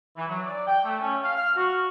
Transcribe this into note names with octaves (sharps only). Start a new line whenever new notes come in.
E3
F#3
D5
G5
A3
C#4
F5
F6
F#4